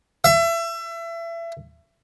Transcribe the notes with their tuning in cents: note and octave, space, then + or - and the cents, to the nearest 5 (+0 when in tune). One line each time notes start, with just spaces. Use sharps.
E5 +30